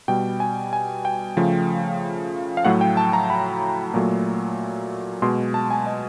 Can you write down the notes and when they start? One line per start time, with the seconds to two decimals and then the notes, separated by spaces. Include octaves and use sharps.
0.08 B2 G3 G5
0.40 G#5
0.73 G#5
1.05 G5
1.37 C#3 F3 A3
2.57 F5
2.65 A2 F#3 A3 F#5
2.81 G5
2.97 A5
3.13 A#5
3.30 B5
3.94 A#2 F#3 A3
5.22 B2 G#3 C6
5.54 A5
5.70 G#5
5.86 D#5